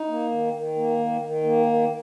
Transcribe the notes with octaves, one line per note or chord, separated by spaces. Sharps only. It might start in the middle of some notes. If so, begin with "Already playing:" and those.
Already playing: D#4
A#3
D#3
D#3
A#3
D#3
D#3
A#3
D#3